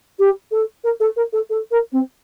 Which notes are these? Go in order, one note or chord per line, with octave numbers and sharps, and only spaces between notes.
G4
A4
A#4
A4
A#4
A4
A4
A#4
C4